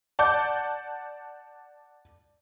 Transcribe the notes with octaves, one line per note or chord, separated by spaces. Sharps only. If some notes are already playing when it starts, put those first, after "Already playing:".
D5 F#5 A5 D6 G6